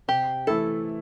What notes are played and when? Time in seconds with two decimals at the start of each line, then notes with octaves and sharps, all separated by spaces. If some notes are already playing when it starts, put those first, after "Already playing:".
0.08 C3 G4
0.47 E3 A3 E4 A4